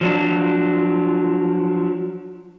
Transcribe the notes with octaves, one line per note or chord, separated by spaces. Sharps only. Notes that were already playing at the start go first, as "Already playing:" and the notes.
F3 F#3 D4